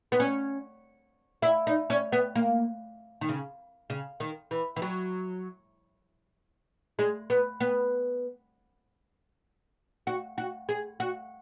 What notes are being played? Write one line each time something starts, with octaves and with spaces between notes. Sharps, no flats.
B3
C#4
E4
D#4
C#4
B3
A#3
D#3
C#3
C#3
D#3
E3
E3
F#3
G#3
B3
B3
F#4
F#4
G#4
F#4